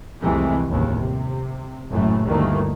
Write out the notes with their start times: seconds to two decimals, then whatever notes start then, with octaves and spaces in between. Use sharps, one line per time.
0.21 C2 F2 C3 E3 G#3 A3
0.67 G1 D#2 A2 C#3
0.98 C3
1.91 F#1 F#2 A2 E3 A3
2.25 G1 D2 D#3 E3 A3 A#3